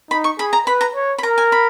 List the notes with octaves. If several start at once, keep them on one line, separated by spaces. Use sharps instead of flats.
D#4 B5
C#6
G#4 B5
A#5
B4 B5
A#5
C#5
B5
A#4 A#5
G#5
B5